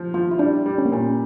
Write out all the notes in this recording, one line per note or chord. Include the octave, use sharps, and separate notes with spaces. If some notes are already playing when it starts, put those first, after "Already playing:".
Already playing: F3
F3 F4
E4
G3 D4
G3
C#4
A#3
A#2 C#4